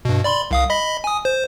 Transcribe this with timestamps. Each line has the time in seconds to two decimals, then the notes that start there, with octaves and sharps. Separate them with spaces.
0.05 G2 B2
0.24 D5 B5 C6
0.51 C2 F5 D#6
0.70 D#5 B5 B6
1.04 G#5 D#6
1.25 C5